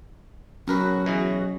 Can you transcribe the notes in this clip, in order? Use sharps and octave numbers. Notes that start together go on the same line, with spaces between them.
B1 F#3 C#4 F#4 A#4 B4
B2 E3 G#4